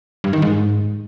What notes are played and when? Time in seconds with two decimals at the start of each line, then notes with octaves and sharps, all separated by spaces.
0.24 G2
0.33 D#3
0.42 G#2